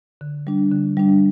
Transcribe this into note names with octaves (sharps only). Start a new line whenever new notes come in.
D3
G3 D4
D3
G3 D4